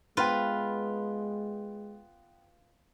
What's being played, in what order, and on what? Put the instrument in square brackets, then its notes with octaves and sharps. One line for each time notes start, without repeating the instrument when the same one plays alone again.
[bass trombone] G#3 [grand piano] B3 G5 [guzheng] F4 B4